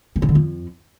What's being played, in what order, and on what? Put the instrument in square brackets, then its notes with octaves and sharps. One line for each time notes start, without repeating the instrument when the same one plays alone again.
[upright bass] B2
C#3
D3
F2